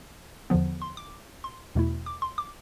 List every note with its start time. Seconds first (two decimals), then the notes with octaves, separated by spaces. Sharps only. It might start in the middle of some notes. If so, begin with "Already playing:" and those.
0.50 E2 D3 F3 B3
0.82 C6
0.97 D6
1.44 C6
1.75 E2 B2 A3 E4
2.06 D6
2.22 C6
2.38 D6